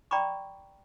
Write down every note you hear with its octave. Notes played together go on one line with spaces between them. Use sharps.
D5 G5 A#5 B5 C#6 D6